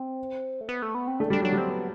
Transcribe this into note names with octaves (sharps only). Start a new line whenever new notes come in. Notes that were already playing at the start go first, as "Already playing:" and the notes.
Already playing: C4
A3
B3
A3
B3
C4
A3 D4
G3 D4
F#3 D4
G3 C4
B3